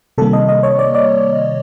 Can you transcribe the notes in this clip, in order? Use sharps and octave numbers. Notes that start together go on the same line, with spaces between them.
C3 D#3 G3 A#3 A4
D#5
D#5
C#5
D5
D5